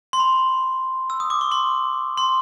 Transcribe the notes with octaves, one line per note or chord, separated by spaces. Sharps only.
C6
B5
E6
D#6
D6
C#6
C6
C6